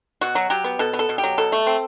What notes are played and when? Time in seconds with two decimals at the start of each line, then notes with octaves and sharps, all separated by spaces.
0.21 B2 F#4
0.35 F#3
0.50 F#3 G4
0.64 B3
0.79 B2 A4
0.93 B3
0.99 A4
1.09 B2
1.18 G4
1.24 F#3
1.38 B2 A4
1.52 A3
1.67 C4